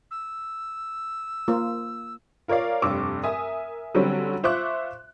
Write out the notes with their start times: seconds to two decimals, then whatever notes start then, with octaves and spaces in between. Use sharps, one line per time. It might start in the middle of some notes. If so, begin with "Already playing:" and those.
0.11 E6
1.48 A#3 F4
2.48 F4 A#4 C#5 D5 F5
2.82 F1 G2 C#6 D6 E6
3.24 A#4 E5 G#5 D#6
3.95 D3 F#3 G3 C4 C#4
4.43 F4 C5 E5 C#6 D6 F#6